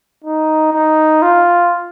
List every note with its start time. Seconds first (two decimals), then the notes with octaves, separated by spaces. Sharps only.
0.24 D#4
0.73 D#4
1.22 F4